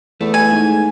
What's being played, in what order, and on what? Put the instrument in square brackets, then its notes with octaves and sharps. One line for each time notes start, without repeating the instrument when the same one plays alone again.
[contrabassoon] E2 [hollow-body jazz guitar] A3
[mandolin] G#5
[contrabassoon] G#2